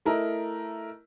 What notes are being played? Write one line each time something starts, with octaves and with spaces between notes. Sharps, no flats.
A3 E4 A#4 D#5